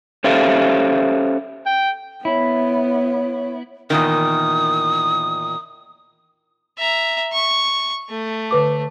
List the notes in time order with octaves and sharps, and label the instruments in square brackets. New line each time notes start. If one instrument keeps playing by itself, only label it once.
[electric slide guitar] C#4 G4 A4 C5 E5 F5
[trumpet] G5
[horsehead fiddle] B3 [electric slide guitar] E4 [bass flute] C#5
[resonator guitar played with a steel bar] E2 A#2 D#3 [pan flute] D#6
[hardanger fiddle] E5 A#5
C#6
A3
[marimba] D3 B4 D6